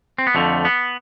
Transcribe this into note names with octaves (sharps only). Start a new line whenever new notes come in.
C4
B3
F2 D3 F3 A3
B3